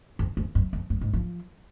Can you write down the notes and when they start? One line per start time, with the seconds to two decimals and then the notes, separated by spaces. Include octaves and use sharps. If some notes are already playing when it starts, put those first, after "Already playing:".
0.19 F2
0.37 F2
0.55 F#2
0.73 F2
0.90 F#2
1.01 G#2
1.13 F3